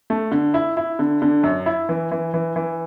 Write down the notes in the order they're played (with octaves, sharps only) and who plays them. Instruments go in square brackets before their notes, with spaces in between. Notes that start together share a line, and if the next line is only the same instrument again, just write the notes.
[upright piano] A3
D3
E4
E4
D3
D3
F#2
E4
E3
E3
E3
E3